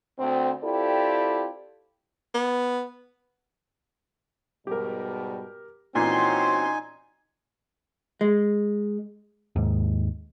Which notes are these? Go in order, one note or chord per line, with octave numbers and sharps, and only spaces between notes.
D2 C4
C4 E4 F4 G4 A4 D5
B3
G#2 B2 G3 G4 A#4
A#2 E3 C4 C#4 D#4 F#4 G#5 C6
G#3
D#2 G#2